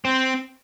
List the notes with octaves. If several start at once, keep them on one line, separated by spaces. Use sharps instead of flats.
C4